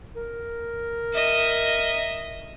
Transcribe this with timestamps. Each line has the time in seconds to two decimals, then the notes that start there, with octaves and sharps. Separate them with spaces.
0.16 A#4
1.14 D#5 E5